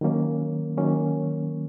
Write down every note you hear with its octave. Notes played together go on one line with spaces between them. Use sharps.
D#3 F#3 A#3 C#4
D#3 F#3 A#3 C#4